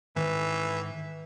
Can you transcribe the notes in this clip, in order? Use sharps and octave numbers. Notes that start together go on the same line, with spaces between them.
G#2 D#3 E3 B4